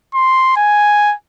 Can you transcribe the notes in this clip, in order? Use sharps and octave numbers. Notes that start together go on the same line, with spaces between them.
C6
G#5